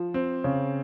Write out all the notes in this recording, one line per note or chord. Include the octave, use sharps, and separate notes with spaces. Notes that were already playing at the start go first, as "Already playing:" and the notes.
Already playing: F3
C4
C#3